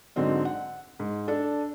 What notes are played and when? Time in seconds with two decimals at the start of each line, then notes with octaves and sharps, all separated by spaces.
0.16 G#2 D3 F#3 C4 D#4
0.45 F#5
1.00 G#2
1.28 D4 A4